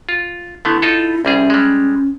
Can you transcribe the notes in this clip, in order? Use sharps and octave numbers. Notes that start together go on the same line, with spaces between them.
F4
D3 A3 B3 E4
D#4 F4 A4
C2 G3 C#4 G#4
G3 G#3